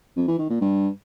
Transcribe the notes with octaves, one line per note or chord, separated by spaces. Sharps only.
F2
E3
D#3
A#2
G2